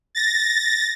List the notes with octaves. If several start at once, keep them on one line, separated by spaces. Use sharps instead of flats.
A6 A#6